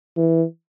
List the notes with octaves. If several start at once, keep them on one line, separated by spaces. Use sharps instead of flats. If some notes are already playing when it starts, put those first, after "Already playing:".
E3